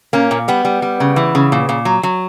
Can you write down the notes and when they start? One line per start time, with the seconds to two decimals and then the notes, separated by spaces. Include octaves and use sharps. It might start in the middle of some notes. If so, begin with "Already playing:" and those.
0.13 A#2 A#3 C#4
0.31 A#2
0.48 G3 B3
0.65 G3
0.82 G3
1.00 C#3
1.16 E3
1.35 C#3
1.52 A#2
1.69 A#2
1.85 F#3
2.03 F#3